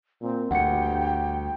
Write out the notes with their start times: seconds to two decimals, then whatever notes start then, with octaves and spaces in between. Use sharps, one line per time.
0.22 A#2 C4
0.51 D2 G2 F#5 G5 C#7